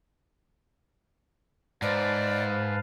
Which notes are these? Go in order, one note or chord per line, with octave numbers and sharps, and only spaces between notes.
G#2 B4 C5 D5 F5 A5